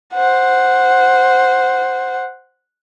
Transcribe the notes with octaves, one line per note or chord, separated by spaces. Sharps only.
C5 F#5